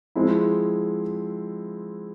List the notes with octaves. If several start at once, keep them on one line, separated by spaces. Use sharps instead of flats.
F3 G#3 C4 E4